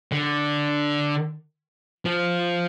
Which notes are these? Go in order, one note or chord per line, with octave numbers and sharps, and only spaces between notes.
D3
F3